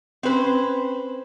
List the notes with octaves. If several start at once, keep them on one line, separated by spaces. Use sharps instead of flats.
C4 C#4 B4 C5